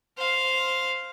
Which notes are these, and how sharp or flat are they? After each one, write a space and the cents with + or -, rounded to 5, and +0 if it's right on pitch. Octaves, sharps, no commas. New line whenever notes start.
C5 +0 F5 +0